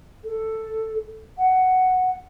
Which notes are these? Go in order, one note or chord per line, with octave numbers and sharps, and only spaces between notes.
A4
F#5